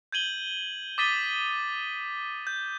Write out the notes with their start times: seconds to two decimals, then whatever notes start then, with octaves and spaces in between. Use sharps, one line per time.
0.12 G6 G#6 D#7 F#7 G7
0.98 D6 D#6 A6 B6 D#7 G7
2.47 G6